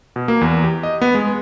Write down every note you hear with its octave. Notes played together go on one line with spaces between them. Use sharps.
B2
A#3
E2
G4
D#5
B3
G#3